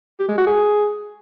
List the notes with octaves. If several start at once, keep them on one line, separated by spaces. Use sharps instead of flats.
G4
G#3
F#4
G#4